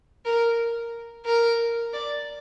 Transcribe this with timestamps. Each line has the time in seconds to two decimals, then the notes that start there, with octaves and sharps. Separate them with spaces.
0.25 A#4
1.26 A#4
1.93 D5